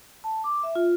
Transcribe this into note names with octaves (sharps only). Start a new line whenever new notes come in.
A5
D6
E5
F4